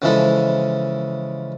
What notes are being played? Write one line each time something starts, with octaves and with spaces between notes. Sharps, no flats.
C#3 E3 F3 G#3 E4 A4